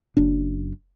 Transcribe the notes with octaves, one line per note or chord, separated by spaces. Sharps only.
F#1 F#2 D4